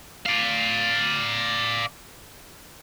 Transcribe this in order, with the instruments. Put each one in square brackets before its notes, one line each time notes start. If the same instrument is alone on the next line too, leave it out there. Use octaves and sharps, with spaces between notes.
[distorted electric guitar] D5 F5